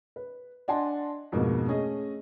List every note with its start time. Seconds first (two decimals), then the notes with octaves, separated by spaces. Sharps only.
0.16 B4
0.68 D4 D#5 F#5 G#5 A5 C6
1.32 F2 G#2 B2 G#3 A#3 B3
1.68 A3 C#4 G#4 D#5